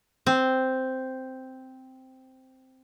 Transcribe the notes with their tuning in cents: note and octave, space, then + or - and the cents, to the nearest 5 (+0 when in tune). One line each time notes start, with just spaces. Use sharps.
C4 -5